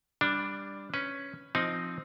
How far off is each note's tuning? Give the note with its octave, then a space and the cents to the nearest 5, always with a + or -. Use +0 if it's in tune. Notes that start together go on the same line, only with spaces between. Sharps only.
G3 +15 D4 +0
C#4 +0 B4 +10
F3 +0 C4 +0 D#4 +0